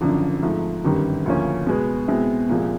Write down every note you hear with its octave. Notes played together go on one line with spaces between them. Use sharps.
G#1 F#2 D3 F3
G#2 F3 A3
G1 F#2 D#3 G3
D2 C#3 F3 A#3 C#4
B2 G#3 B3
B2 G#3 C4 E4
C2 A#2 F3 G#3